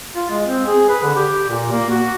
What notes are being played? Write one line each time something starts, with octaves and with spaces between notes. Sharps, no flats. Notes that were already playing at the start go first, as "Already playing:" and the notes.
F4
G#3
C4
G#4
B4
D3
G4
A#2
A#3
F#4